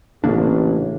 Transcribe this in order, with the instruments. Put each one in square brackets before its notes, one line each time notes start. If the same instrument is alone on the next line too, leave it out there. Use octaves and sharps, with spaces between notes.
[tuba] A1 [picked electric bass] C#3 A#3 D4